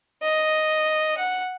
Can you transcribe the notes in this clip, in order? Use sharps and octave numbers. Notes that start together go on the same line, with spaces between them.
D#5
F#5